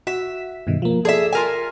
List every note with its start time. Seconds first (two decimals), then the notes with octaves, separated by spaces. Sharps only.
0.07 F#4 E5 B6
0.67 G2 B2 D#3
0.82 F3 A#3
1.05 G#4 A4 D5 E5 B6
1.33 F4 A#4 G#5